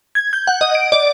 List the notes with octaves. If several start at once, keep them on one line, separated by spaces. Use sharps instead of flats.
G#6
G6
F#5
D#5
D7
D5